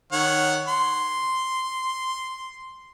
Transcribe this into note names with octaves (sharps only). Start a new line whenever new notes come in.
D#3 C#5 F#5
C6